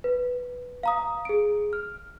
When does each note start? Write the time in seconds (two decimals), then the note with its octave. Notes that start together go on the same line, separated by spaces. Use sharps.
0.04 B4
0.83 F5 A#5 D#6
1.25 G#4 D7
1.73 F6